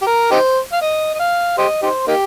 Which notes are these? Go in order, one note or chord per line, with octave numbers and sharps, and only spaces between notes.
G4
A#4
D#4 G4 C5
F5
D#5
D#5
F5
G4 C5 D#5
D#4 G4 C5
A#3 D#4 G4